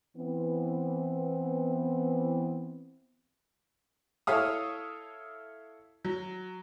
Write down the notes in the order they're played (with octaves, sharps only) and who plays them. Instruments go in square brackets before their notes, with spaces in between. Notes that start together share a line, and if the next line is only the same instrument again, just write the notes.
[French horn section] E3 B3 C4
[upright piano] E4 A4 C#5 E5 F5 D#6
F#3